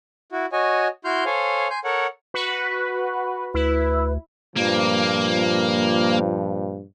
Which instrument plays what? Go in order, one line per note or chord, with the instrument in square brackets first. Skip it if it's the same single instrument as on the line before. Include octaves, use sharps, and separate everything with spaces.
[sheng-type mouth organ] E4 F#4
F#4 C#5 D#5 G#5
E4 F#4 C6 F6 G6
A4 C5 C#5 F5 G#5
G#5 C6 G6
A4 A#4 C#5 F#5
[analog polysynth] F#4 B4
[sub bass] D2 [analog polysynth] E4 [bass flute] B4
[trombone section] G2 A#2 F3 [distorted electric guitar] A#3